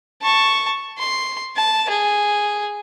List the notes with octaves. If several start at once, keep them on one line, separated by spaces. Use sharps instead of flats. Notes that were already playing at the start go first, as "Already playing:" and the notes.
A5 C#6
C6
A5
G#4